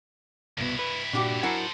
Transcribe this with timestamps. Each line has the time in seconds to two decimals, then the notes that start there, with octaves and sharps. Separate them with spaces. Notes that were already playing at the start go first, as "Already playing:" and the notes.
0.58 C2 G2 B2 B3 E4
0.79 B4
1.13 A#2 D4 F#4 G4
1.43 F#3 E4 A4 A#4 C5 F#5 G#5